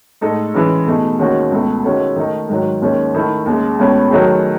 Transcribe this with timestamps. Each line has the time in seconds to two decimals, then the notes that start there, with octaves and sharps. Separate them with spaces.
0.21 A2 G#3 D#4 A4
0.54 C#3 E3 G#3
0.86 B2 A3 D#4 G#4
1.19 D#2 D#3 G#3 C#4 F#4
1.51 C#2 B2 A3
1.84 D#3 G#3 C#4 F#4 A4
2.16 D#3 A3 D#4
2.49 G#2 D#3 F#3
2.82 D#2 D#3 G#3 C#4
3.14 D#3 A3 E4 A4
3.46 D#2 C#3 G#3
3.79 C#2 B2 A3 C#4
4.11 D#3 F#3 A3 D#4 G#4